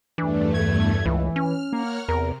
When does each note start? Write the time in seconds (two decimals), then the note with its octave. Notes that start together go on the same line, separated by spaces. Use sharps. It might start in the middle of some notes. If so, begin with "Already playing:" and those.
0.18 E2 G2 E3 A3 D4
0.54 G#6
1.06 C#2 E3
1.36 C#4 F6
1.73 A#3 C#5 F#5 F6
2.09 E2 C3 A#4